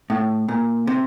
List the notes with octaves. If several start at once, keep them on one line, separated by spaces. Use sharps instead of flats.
A2
A#2
C3